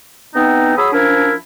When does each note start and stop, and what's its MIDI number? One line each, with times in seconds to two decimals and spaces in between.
0.34 0.77 40
0.34 0.77 59
0.34 0.77 60
0.34 0.77 63
0.77 0.89 54
0.77 0.89 68
0.77 0.89 83
0.77 0.89 87
0.77 0.89 88
0.93 1.34 53
0.93 1.34 61
0.93 1.34 62
0.93 1.34 64
0.93 1.34 70